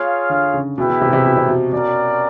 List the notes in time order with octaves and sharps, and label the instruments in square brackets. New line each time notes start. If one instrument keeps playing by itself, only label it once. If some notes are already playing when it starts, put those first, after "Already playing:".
Already playing: [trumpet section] F4 G#4 C#5 F5
[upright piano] D3
C#3
[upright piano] B2 [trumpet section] E4 G#4 B4 E5 G5
[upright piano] B2
C3
B2
C3
B2
C3
B2
[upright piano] B2 [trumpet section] C#4 F#4 A#4 D5